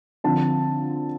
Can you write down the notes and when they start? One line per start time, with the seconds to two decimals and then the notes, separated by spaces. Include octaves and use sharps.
0.24 D3 F3 C4 A5